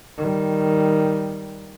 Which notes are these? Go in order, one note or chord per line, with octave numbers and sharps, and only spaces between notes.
D#3 G3